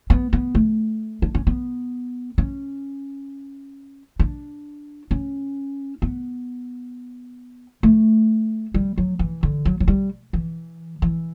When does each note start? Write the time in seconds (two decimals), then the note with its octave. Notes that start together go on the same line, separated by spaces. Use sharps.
0.10 B3
0.33 B3
0.55 A3
1.22 D4
1.35 C#4
1.47 B3
2.38 C#4
4.20 D4
5.11 C#4
6.02 B3
7.83 A3
8.74 G3
8.98 F#3
9.19 E3
9.43 D3
9.65 F#3
9.80 F#3
9.88 G3
10.33 E3
11.02 E3